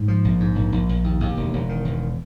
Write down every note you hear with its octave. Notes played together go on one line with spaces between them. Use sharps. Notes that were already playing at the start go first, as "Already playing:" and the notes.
Already playing: G#2
F3
A#1
G#2
A#1
A#1
A#1
D#2
D#2
E1
E1
D#3
E1